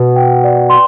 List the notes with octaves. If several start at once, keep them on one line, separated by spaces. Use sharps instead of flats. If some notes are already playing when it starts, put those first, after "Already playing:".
Already playing: B2 B4
G5
D5
C6